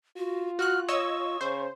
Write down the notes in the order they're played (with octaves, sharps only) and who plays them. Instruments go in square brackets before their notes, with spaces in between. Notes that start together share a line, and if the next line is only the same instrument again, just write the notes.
[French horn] F4 [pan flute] F#4
[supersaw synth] F#4 F#6 [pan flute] F6
[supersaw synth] C#5 D#5 E6 [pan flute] C#6
[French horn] C#3 [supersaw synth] C5